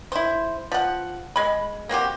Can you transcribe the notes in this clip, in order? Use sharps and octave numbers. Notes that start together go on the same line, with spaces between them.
E4 C5
F3 F#5
G#3 B5
A#3 C4 F#4 G4